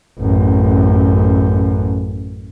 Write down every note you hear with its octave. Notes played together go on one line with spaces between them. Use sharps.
A1 F#2